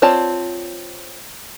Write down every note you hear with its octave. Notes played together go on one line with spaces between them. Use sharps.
C4 F4 C#5 D5 A5